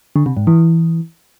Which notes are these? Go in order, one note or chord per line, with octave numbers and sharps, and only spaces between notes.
D3
C3
G#2
E3